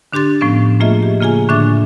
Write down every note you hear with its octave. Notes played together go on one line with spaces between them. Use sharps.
D3 D4 G4 C6 A6
A2 F3 B3 C#4
A3 A#3 F4 G#4 D#5 E5
G4
C#3 A#3 F4 G#4 G#5
A2 D3 D4 E5 D6 A6